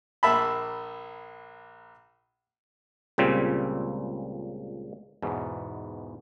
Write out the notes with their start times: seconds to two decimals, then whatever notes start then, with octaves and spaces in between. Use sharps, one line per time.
0.23 A#1 A#3 E5 A5 B5
3.18 C#2 A#2 C#3 G3 C4
5.22 E2 G#2 B2